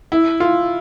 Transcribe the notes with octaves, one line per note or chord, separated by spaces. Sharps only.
E4
F4